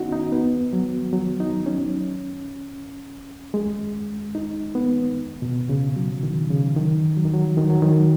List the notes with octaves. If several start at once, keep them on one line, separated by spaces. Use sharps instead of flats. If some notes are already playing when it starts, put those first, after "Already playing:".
Already playing: B3 C#4 D#4 F#4
D#4
B3
F#3
F#3
D#4
C#4
G#3
D#4
B3
B2
C#3
F#3
D#3
C#3
D#3
F#3
D#3
F#3
D#3
F#3
D#3